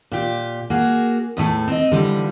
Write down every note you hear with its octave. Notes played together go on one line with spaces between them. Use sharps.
A#2 G4
A#3 F#4 G#4
E2 A2 A3
C4 D#5
D3 E3 F3 G3